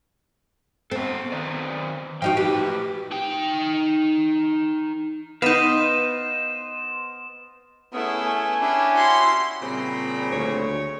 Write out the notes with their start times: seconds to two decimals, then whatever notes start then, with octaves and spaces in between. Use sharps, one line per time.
0.91 B3 C4 A4
1.32 D#3 B4 D5
2.22 F3 D#4 F#4 G5
2.37 A2 G4 B4
3.12 D#4 G5
5.42 B3 D#4 B4 C5 D#5 F5 E7
7.93 A3 B3 C#4 E4 G#4
8.27 G#5
8.61 C#4 D4 E4 G4
8.97 F#4 C6
9.62 A#2 C#3 G3 C4 A#5 B5
10.32 D2 C#5